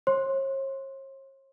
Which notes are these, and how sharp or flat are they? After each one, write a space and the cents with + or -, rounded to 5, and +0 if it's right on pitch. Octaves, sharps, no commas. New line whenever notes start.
C#5 -45 C6 +5